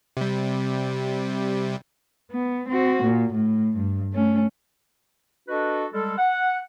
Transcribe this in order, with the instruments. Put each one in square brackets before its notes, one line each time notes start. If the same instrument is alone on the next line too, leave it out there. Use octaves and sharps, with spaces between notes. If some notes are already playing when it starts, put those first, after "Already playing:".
[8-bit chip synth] C3 G3
[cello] B3
C4 F#4
A#2
A2
G2
A3 C#4
[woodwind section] D4 F#4 A4 B4 D#5
G3 G#3 A4
F#5